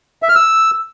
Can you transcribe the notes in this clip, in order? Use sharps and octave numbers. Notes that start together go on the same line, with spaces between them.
E5
F6
E6